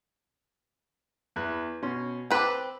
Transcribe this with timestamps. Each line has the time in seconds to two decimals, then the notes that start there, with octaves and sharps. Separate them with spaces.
1.36 E2 B4 F#6
1.82 B2 C#4 C6
2.31 C4 B4 A5 C6 D6